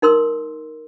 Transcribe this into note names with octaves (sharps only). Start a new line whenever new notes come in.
D#4 A#4 C6 E6